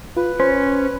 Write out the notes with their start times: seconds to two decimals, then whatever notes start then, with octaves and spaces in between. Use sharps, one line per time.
0.17 F4 B4
0.40 C#4 C5